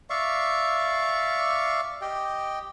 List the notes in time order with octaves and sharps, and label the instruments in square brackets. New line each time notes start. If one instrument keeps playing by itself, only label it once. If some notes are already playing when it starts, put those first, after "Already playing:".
[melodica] D5 E5 F5 C#6
G4 D#5 G5